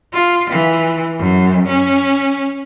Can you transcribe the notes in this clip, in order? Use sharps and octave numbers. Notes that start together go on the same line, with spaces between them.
F4
E3
F#2
C#4